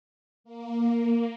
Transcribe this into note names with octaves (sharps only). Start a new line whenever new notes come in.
A#3